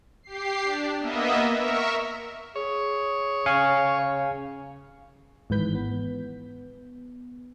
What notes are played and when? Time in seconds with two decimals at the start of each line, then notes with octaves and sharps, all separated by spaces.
0.23 G4 C7
0.64 D4
0.99 A#3 B3 D#5 E5
1.54 A#4 E5 C#6
2.56 G#4 C#5
3.46 C#3 F5 G#5 C#6
5.50 G#1 G#2 E3 B4 G6 B6
5.75 B3